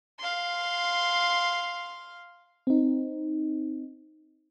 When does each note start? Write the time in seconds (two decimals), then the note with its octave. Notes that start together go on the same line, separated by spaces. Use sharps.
0.19 F5 C6
2.67 C4 D#4